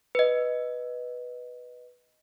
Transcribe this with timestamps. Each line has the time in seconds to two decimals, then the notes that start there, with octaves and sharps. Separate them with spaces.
0.15 B4 D#5